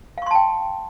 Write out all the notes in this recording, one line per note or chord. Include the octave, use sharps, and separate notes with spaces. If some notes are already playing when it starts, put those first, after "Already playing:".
F5 G5 A5 C6 C#6